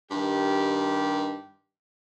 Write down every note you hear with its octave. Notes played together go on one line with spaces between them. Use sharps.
G2 D#3 G4